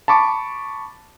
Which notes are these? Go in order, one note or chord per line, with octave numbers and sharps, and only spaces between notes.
A5 B5 C#6 D6